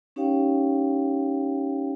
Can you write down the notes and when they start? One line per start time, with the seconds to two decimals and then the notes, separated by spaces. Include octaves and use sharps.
0.16 C#4 D#4 G4 C#5 F5 G5